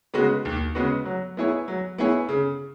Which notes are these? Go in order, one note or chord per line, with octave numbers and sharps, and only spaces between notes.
C#3 G#3 B3 F#4
D#2
C#3 G#3 B3 F#4
F#3
B3 E4 G#4 C#5
F#3
B3 E4 G#4 C#5
C#3